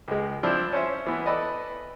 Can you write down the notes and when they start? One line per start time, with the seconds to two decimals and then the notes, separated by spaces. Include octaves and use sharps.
0.08 C#2 G#3
0.43 F3 C4 D4 E4
0.72 C#4 C5 E5
1.06 E3 B3
1.26 A4 B4 D5 D#5